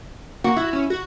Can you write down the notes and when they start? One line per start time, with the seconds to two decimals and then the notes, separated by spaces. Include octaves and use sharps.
0.44 A#3 F#4
0.56 E4 F#4
0.73 C#4
0.90 F#4